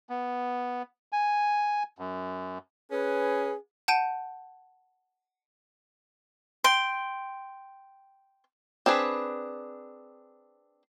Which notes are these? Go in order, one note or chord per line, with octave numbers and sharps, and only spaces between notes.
B3
G#5
F#2
C#4 G#4 B4
F#5 A5 G6 D7 D#7
G5 C6
C4 D4 G#4 B4